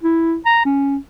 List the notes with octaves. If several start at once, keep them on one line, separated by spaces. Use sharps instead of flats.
E4
A#5
C#4